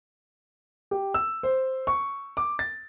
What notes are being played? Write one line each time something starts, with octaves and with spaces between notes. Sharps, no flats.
G4
E6
C5
C#6
D6
A6